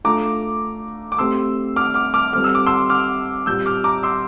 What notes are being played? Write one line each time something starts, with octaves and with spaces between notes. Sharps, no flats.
A3 D4 F4 A4 A#5 D6
D6
A3 C4 G4 C6 E6
D6 F6
D6 F6
D6 F6
G3 C4 F4 A4 F6
E6
D6
C6 E6
D6 F6
A#2 G3 C4 G4 E6 G6
D6 F6
A#5 D6
C6 E6